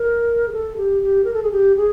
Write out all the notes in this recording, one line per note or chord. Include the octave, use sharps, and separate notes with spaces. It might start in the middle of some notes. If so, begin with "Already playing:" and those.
Already playing: A#4
G#4
A4
G4
G4
A#4
A4
G#4
G4
G#4